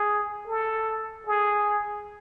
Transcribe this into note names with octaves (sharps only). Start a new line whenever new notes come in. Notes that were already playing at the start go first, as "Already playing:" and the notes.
Already playing: G#4
A4
G#4